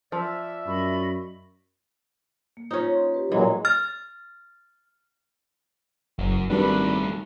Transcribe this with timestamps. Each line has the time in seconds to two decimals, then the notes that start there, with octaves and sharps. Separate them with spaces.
0.12 F3 D5 E5
0.67 F#2 D#5 B5 C#6
2.57 A#3
2.71 C#4 D#4 F4 C5
2.95 C6
3.14 G4 B4
3.32 A#2 E3 F#3 G#3
3.65 F6 A6
6.19 F#1 F#2
6.50 G#1 D#3 G3 A3 D4 B4